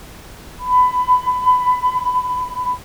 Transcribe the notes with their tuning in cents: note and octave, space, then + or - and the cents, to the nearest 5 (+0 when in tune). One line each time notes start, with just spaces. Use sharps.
B5 +20